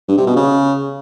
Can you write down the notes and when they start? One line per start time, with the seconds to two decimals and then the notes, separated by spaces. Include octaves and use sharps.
0.08 G2
0.18 C3
0.27 B2
0.36 C#3